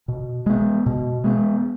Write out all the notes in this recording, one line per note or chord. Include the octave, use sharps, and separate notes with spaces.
B2
G#3 B3
B2
G#3 B3